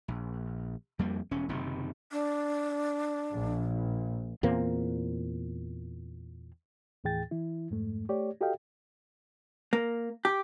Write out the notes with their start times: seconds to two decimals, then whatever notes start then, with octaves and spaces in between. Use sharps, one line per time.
0.08 A#1
0.99 F2 G3 A#3
1.31 E1 C#4
1.49 F#1 C3 D#3
2.12 D4
3.33 A#1
4.43 E2 A#2 A#3 C4
7.04 D#2 A2 E3 G#4 G5 A6
7.31 E3 E4
7.71 F2 G#2 A3
8.09 A3 G4 C#5 D5
8.41 F#4 G4 A4 D#5 F5 G5
9.73 A#3
10.25 G4